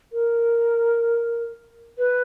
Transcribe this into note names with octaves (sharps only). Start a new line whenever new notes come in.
A#4
B4